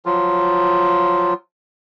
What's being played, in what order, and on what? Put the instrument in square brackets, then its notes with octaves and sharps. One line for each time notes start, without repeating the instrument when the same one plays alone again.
[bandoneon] F3 F#3 F4